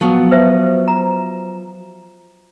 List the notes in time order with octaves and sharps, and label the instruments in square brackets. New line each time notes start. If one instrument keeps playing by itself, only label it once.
[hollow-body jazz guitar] F3 F#3 B3
[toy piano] B4 C5 E5
A#5